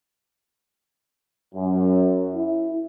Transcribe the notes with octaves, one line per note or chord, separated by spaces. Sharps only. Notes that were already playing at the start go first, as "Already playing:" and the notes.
F#2
E4